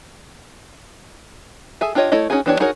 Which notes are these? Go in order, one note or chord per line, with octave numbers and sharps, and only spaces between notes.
G#4 A4 E5 G#5
D4 F4 G4 C#5 D#5
A3 E4 C#5 D#5
C#4 D#4 F#4 G#4 G#5
E3 B3 D4 G4 C#5
D#4 F#4 G#4 A#4 C#5